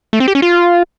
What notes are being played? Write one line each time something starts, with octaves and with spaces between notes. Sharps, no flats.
A3
C4
G4
C#4
F4